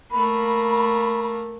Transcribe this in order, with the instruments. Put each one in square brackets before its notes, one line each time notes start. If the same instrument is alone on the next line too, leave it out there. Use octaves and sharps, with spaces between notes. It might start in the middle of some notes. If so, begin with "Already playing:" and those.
[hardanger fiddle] A3 A#3 [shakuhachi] B5